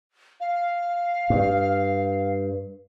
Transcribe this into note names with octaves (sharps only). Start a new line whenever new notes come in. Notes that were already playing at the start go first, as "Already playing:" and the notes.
F5
G2